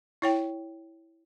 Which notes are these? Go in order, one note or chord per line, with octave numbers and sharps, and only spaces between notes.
E4 C#5 G5